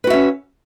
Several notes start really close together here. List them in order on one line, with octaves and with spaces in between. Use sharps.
B4 F#4 E5 C#4